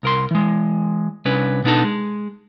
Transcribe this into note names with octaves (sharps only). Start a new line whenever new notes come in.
C2 A#4 C6
E3 G#3
C2 C#4 D4 B4
B2 B3 D4 D#4 A4
G#3